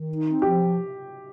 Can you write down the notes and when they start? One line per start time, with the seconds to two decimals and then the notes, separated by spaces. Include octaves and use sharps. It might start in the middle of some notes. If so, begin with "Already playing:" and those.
Already playing: D#3
0.10 D#4
0.26 C4
0.42 F3 G4